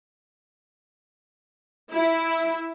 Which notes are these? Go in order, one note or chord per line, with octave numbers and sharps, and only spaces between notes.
E4